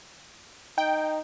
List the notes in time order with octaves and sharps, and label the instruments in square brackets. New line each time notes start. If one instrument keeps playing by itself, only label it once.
[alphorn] D#4 [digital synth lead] G5